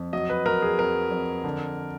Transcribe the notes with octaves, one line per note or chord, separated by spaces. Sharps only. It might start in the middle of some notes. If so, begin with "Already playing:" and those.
Already playing: F2
F#3 D#5
B4
F#3 A#4
G#4
F2 A#4
F2
D3